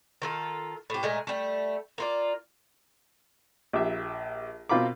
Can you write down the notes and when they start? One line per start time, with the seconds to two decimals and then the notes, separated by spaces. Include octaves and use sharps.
0.22 D#3 F4 A4
0.90 A2 G4
1.03 A#2 G#3 A3
1.27 G3 A3
1.98 A#3 F4 D5
3.73 A#1 G4 E5
4.69 B2 C4 F4 A#4 B5 D6